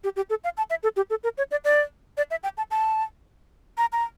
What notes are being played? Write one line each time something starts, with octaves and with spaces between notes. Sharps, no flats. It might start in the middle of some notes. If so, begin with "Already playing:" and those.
G4
G4
A4
F5
A5
E5
A4
G4
A4
A#4
C#5
D5
D5
D5
E5
G5
A5
A5
A#5
A#5